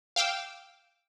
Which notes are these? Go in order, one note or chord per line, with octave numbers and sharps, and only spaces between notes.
F5 G5 D6 E6